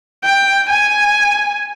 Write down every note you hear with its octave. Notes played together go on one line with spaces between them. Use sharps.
G5
G#5